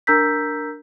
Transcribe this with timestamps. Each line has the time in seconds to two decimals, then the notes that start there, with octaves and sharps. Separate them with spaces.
0.07 D4 A#4 A#5 E6 G6 B6